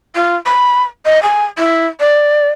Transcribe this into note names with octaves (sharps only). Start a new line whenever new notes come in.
F4
B5
D#5
G#5
E4
D5